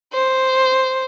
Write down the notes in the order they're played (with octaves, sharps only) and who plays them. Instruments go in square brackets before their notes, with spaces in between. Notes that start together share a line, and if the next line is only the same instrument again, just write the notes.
[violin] C5